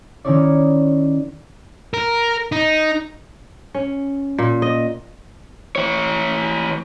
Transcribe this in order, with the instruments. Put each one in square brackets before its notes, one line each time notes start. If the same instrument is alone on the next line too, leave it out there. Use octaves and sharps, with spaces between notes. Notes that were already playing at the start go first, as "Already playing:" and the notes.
[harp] D#3 C#4 D#4 E4 C#5 D5
[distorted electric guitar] A#4
D#4
[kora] C#4
A#2
D#5
[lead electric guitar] E3 C#5